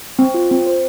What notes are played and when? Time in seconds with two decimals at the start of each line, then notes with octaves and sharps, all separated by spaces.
0.19 C4
0.34 F4
0.51 C4
0.67 C5